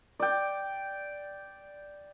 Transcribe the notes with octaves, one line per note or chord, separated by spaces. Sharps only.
D5 G5